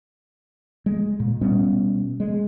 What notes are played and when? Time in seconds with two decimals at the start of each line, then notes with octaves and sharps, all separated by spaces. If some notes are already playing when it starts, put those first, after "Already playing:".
0.86 G#3
1.20 A#2
1.41 B2 G3 B3 C#4
2.20 G#3